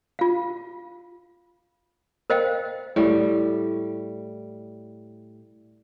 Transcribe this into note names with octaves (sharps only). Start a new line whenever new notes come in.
F4 F5
A#4 C5 D#5 F5 G5
A2 G3